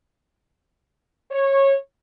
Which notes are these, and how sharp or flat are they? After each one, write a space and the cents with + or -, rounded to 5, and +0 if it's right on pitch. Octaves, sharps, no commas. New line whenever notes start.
C#5 -20